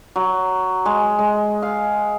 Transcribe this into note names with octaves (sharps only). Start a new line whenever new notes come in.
F#3
G#3
G#3
F5